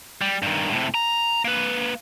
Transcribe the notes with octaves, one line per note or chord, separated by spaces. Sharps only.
G3
G2 D#3
A2 C3
A#5
A#3 B4